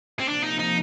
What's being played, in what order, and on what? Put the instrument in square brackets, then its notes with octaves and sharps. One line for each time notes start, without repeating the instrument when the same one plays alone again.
[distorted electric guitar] C4
[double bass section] C3 F3 A#3 [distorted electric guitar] D4
[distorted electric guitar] D#4
D#4